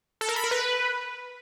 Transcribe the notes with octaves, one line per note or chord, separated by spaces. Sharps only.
A4
A#4
B5
A#4
B4